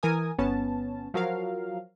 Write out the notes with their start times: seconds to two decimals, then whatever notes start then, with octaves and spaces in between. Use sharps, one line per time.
0.03 E3 A#4 G#5 D#6
0.38 G1 B3 C#4 A5
1.14 F3 F#3 A#4 F5